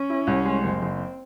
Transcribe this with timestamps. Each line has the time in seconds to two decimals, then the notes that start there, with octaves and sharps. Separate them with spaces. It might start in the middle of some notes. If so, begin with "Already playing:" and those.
Already playing: C#4
0.10 E4
0.27 C2
0.46 G#3
0.64 F#1 C4
0.82 F#1